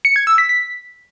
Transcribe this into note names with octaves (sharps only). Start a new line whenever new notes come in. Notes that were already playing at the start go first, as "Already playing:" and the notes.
C#7
G#6
E6
B6
B6